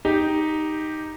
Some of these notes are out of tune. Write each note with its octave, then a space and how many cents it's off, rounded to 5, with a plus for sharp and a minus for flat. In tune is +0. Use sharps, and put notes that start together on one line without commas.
D#4 +0 G4 +0